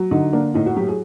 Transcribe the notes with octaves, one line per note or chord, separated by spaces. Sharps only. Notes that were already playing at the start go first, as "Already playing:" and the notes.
Already playing: F#3
D3 D#4
A#3 D4
A2 D#4
F#4
F#3 G4
G#4